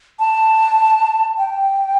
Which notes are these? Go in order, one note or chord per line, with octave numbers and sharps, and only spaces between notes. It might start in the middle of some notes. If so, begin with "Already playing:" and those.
A5
G5